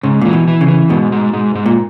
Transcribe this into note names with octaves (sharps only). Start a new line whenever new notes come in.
G#2 C#3
A#2 E3
B2
E3
C#3
E3
G#2 B2
G#2
G#2
G#2
A#2